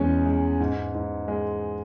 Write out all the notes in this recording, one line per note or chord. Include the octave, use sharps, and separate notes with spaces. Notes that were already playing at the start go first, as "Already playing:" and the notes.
Already playing: E2 G#3 C#4
G#3
G#2
G#2
G#3